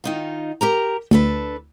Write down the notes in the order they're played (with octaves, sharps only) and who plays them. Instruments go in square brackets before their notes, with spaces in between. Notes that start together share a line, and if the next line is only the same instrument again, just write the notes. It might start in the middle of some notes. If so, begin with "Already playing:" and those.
[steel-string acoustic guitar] D#3 D#4 F4
G4 A#4 A#5
[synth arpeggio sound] D2 [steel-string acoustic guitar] D4 A4 B4